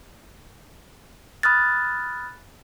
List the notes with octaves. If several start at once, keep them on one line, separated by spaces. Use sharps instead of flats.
B5 D#6 F6 F#6 A6